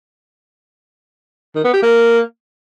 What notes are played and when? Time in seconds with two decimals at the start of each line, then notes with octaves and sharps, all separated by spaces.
1.55 D#3
1.64 B3
1.73 G4
1.82 A#3